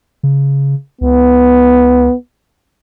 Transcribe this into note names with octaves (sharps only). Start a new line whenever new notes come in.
C#3
C#2 B3